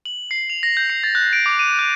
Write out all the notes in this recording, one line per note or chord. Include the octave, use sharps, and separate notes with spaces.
F#7
C7
F7
A#6
G6
C7
A6
F#6
D7
D6
D#7
F#6